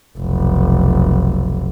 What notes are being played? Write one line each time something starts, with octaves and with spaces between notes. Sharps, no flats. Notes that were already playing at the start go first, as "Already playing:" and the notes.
F1 B1